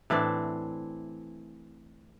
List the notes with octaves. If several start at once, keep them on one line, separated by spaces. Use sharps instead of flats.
A2 E3 C4 D4